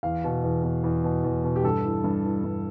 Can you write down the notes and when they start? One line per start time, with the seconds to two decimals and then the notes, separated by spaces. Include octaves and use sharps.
0.03 E2 F5
0.24 B2
0.44 E2
0.64 B2
0.84 E2
1.04 B2
1.24 E2
1.44 B2
1.56 G4
1.64 G2 A4
1.84 E3
2.04 G2
2.24 E3
2.44 G2